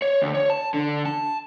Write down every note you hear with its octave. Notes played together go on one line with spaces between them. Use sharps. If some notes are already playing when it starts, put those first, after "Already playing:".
C#5
D2
C#5
A5
D3
A5